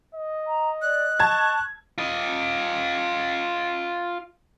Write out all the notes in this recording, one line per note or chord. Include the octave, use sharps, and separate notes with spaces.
D#5
A#5
D5 F#6
A5 C#6 G#6
F4 D#5